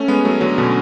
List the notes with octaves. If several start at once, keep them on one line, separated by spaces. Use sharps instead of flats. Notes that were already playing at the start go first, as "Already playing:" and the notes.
Already playing: A3 C#4
G#3 B3
F#3 A3
D3 F#3
B2 D3